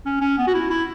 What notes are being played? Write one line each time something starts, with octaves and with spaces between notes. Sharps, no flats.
C#4
C#4
B3
F#4
E4
E4